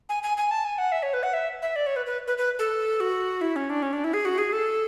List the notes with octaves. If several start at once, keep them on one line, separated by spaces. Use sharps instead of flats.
G#5
G#5
G#5
A5
G#5
F#5
E5
C#5
B4
F#5
E5
E5
D5
C#5
B4
B4
B4
B4
A4
F#4
E4
C#4
D4
C#4
D4
E4
G#4
F#4
G#4
A4